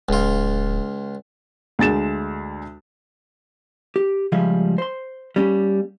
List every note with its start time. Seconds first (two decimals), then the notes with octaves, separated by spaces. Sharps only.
0.09 D1 C#2 F4
1.79 D2 G#3 A6 E7
3.96 G4
4.32 C#2 F3 G3 G#4 E5 F5
4.78 C5 C6
5.36 G3 A#3 C#4 G4